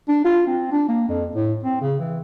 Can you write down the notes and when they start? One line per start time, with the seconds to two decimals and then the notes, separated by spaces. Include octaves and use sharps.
0.08 D4
0.24 F4
0.47 C4
0.71 D4
0.88 A#3
1.08 F2
1.35 A2
1.63 C4
1.81 C#3
1.99 E3